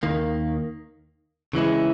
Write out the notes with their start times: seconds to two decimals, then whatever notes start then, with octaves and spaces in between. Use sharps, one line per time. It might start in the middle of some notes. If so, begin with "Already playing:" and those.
0.03 D#2 D#3 A#3
1.53 C#3 E3 G#3 C#4 E4